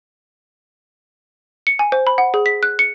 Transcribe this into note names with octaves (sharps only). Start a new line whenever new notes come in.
C#7
G#5
C5
B5
F#5
G#4
B6
F#6
C#7